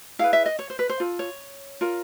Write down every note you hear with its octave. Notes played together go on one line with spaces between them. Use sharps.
E4 G#4 B4 F5
E5
D#5
C#5
C5
B4
C5
F4 A4
C#5
F4 A#4